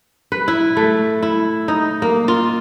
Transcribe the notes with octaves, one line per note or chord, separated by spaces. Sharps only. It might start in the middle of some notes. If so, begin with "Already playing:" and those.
B4
E4
A3
E4
D#4
A#3
F4